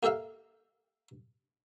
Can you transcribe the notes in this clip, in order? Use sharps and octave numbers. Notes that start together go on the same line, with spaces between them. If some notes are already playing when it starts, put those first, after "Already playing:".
A#3 G4 A4 E5 F5